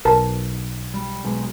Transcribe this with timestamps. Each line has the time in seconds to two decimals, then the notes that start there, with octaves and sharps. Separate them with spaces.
0.05 B1 A#4 A5
0.94 G3
1.24 B2 F#3 G#3